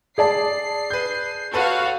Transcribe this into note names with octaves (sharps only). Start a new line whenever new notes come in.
G#4 D5 A5 C7
B4 G6
F#4 A4 B4 C#5 F5